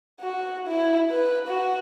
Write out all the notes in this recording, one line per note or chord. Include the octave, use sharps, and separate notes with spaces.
F#4
E4
B4
F#4